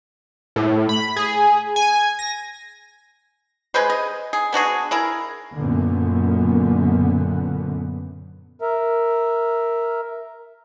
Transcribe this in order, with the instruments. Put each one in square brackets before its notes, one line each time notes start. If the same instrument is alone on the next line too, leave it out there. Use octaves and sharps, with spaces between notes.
[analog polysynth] A2
B5
G#4
G#5
A#6
[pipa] G#3 G#4 B4 C5
D#5
G#4
B3 D4 F#4 G#4
E4 G#4 A#4
[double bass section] F#2 A#2 D3 B3
[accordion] A#4 E5